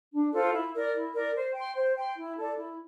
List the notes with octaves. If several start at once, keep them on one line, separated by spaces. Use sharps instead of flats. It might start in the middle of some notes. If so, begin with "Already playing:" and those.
D4
F4 A4 C5
E4
A#4 D5
E4
A#4 D5
C5
G5 C6
C5
G5 C6
E4
A4 D5
E4